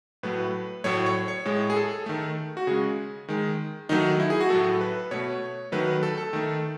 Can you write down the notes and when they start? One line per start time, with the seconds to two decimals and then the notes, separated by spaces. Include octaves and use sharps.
0.23 A2 F#3 A3 B4
0.84 A2 F#3 A3 C#5
1.06 C#5
1.28 C#5
1.45 A2 G#3
1.70 G#4
1.76 A4
2.06 D#3 A3
2.57 F#4
2.67 C#3 G#3 G#4
3.28 D#3 G#3
3.89 D#3 F#3 A3 D#4
4.20 E4
4.30 G#4
4.41 F#4
4.50 A2 F#3 A3 A4
4.81 B4
5.11 B2 A3 C#5
5.72 D#3 F#3 A3 B4
6.03 A4
6.18 A4
6.33 D#3 A3